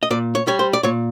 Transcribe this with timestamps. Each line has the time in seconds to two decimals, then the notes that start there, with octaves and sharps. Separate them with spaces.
0.03 D#5
0.11 A#2 D5
0.35 C#5
0.47 G3 C#5
0.59 C5
0.73 D5
0.83 A#2 C#5